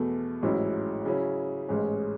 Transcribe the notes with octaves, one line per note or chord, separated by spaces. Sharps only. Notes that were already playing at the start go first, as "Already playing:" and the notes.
Already playing: E2 B2 A3
A1 G#2 F#3 C#4 E4
C#3 F#3 C#4 E4
A1 G#2 G#3 C#4